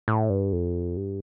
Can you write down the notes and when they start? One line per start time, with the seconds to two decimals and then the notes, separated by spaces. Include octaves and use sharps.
0.08 A2
0.30 G2
0.53 F2
0.97 G2